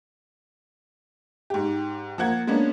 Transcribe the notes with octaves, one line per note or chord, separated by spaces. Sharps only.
G#2 G4
F3 A#3 F#5 G#6
G#3 A#3 B3 C#4 D4